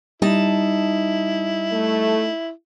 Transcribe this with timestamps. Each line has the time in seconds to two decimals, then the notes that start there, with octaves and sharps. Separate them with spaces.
0.22 G3 D#4 E4 A5
1.72 A3